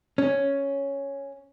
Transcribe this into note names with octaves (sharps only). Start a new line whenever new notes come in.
C#4